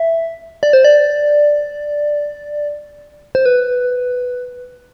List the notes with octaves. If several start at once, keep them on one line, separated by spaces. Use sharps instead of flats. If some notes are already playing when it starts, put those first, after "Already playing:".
Already playing: E5
D5
C5
D5
C5
B4